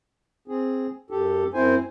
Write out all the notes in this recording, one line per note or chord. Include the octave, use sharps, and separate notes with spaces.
C4 G#4
F#2 G4 A4
F#2 C4 E4 C5 G#5